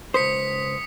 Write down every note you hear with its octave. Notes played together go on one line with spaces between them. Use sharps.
C#2 C5 D#6 B6 C#7